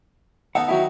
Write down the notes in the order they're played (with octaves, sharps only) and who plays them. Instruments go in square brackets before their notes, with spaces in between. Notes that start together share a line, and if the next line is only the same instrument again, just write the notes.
[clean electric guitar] D#2 F5 F#5 [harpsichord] B3 D#4 A4
[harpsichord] D#3 F#3 D#4 [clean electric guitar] E4 F#4